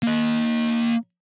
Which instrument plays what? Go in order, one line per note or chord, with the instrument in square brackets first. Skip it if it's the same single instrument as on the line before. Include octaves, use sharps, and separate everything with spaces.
[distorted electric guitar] A#3 D#5